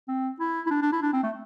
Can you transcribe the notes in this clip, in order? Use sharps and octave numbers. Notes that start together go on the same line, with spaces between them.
C4
E4
E4
D4
D4
E4
D4
C4
A3